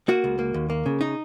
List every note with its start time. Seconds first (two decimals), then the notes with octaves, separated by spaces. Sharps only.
0.08 A#3 F#4
0.24 C#2
0.39 A#3
0.54 D#2
0.70 A#3
0.86 C#3
1.01 D#4